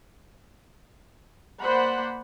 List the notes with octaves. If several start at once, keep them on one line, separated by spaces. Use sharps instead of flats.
A#3 C5 D5 F#5 B5